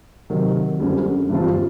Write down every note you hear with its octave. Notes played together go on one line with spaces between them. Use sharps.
C3 D#3 F#3
F#2 D3 G3 C4
G2 E3 G3 C4 F4